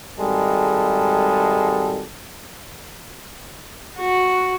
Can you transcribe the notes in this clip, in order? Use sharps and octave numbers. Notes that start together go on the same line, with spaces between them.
G#1 G3 G#3 A4
F#4